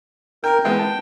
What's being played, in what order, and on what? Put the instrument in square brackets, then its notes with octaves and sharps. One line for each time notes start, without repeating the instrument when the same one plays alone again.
[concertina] A#4 [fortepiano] G5
[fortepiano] E3 G#3 B3 [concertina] G5
[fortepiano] A5